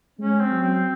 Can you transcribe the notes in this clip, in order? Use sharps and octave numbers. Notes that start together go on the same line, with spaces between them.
G#3 C#4
C4
F#3
C4